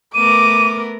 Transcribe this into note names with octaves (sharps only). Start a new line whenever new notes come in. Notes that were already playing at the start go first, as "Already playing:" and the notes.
A3 B3 A#4 D6 D#7